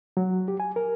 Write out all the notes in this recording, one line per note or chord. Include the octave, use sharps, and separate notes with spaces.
F#3
G4
G#5
A#4